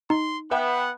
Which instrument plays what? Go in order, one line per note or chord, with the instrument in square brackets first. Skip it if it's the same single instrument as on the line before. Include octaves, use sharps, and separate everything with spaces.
[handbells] D#4 [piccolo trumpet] C6
[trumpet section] B3 [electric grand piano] B4 E5 G5 [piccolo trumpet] F#5